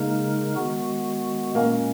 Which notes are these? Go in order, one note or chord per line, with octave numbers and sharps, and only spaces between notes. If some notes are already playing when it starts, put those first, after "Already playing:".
Already playing: C#3 G#3 A#3 D#4 A#4
D#3 G#3 B3 F#4
A#2 G#3 A#3 C#4